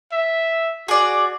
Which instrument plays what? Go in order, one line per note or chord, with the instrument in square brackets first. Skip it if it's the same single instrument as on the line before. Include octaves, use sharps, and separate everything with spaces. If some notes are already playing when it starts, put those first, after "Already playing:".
[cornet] E5
[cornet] F#4 [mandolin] G#4 D5